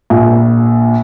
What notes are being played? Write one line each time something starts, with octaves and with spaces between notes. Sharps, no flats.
A#1